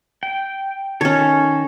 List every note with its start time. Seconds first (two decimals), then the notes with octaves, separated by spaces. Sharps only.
0.23 G5
1.01 D#3 C#4 A4 C#5